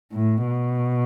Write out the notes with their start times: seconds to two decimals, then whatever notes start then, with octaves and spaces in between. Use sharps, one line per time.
0.13 A2
0.47 B2